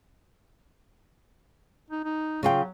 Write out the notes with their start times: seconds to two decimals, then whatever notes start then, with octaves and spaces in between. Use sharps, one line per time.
1.90 D#4
2.04 D#4
2.43 C#3 F#3 F4 G5